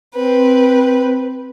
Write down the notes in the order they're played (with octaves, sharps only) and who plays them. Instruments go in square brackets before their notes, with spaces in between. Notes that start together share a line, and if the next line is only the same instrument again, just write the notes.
[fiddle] C4 B4